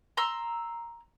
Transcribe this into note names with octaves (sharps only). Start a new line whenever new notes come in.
A#5 C6 E6